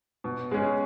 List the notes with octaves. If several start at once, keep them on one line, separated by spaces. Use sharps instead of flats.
B2
G#3 C#4 G#4